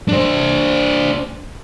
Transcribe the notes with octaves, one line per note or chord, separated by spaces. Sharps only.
D4 C5